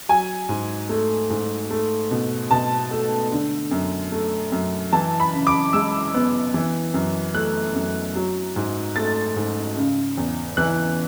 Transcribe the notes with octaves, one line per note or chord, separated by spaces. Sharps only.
F#3 G#5
G#2
A3
G#2
A3
B2
B2 A5
A3
D3
F#2
A3
F#2
E3 A5
B5
C#3
D6
G#3 E6
B3
E3
F#2
A3 F#6
F#2
F#3
G#2
A3 A6
G#2
C#3
E2
E3 F#6